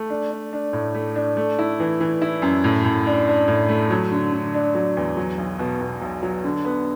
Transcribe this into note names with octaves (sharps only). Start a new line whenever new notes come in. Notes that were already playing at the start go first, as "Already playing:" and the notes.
Already playing: A3
D4
D4
D4
A2
A3
D4
A3
E4
E3
E3
E4
F#2
A2
A2
D4
D4
A2
A3
F#3
D3
D3
D4
F#3
E2
F#3
B1
B2
B2
B1
F#3
D3
B3